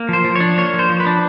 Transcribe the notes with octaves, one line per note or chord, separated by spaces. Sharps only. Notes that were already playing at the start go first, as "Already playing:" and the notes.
Already playing: A#3
F3 C5
F3
D4 C#5
A#3 C#5
F3
C5
F3
B4
D4